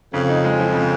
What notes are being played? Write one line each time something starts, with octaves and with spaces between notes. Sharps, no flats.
F2 C#3
D#4
G#3
F3
C#3